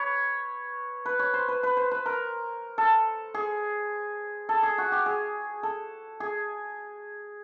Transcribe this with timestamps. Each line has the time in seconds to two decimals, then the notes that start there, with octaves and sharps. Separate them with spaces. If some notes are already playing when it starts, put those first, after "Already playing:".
Already playing: B4 C#5
1.06 B4
1.19 C#5
1.34 C5
1.48 B4
1.63 B4
1.77 C5
1.91 B4
2.06 A#4
2.78 A4
3.34 G#4
4.49 A4
4.63 G#4
4.78 F#4
4.92 G4
5.06 G#4
5.63 A4
6.20 G#4